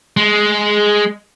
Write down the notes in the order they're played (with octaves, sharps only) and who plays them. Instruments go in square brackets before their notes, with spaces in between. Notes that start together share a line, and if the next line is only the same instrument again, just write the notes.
[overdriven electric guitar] G#3